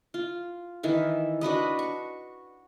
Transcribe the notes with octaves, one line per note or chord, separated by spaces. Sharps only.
F4
D#3 E3 E5
D4 F#4 B4 D#5
C#6